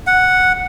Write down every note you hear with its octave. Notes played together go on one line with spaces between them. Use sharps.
F#5